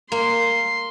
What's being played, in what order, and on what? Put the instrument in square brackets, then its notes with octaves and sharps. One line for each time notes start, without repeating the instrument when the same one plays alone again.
[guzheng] A#3 [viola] C6